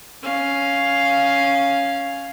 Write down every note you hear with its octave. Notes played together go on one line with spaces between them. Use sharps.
C#4 F5